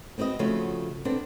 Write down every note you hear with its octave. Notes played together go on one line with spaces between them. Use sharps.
B3 C4 F#4 B4 D#5
C#3 F3 A3 F#4
B3 C4 D4 A4